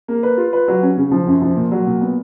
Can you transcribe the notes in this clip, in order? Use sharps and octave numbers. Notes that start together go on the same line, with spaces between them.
A#3
B4
F4
B4
F#3
C#4
C#3
F3
F#2
F3
A#2
F#3
A#2
B3